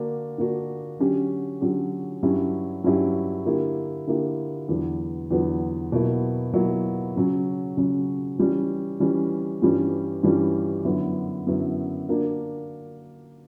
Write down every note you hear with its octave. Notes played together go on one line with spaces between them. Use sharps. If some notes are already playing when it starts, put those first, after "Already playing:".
Already playing: D3 A#3 D4 F#4
D3 A#3 D4 F#4
D3 F#3 C#4 G4
D3 F#3 C#4 G4
G2 F#3 C#4 E4 G4
G2 F#3 C#4 E4 G4
D3 A#3 E4 G4
D3 A#3 E4 G4
E2 D3 F#3 B3
E2 D3 F#3 B3
B2 F#3 A#3 E4
B2 F#3 A#3 E4
C#3 F#3 C#4
C#3 F#3 C#4
E3 G3 C#4
E3 G3 C#4
G2 E3 G3 C#4
G2 E3 G3 C#4
F#2 D3 F#3 B3 E4
F#2 D3 F#3 B3 E4
D3 A#3 D4 F#4